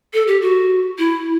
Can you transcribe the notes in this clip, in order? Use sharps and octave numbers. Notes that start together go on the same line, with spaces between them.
A4
G4
F#4
E4